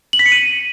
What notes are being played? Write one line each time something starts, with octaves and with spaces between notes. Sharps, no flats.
F#7
B6
C#7
D#7